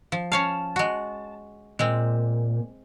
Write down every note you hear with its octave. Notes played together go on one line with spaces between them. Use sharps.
F3
C#4 C#5 F5 A5
G#3 F#4
A#2 G#3 C4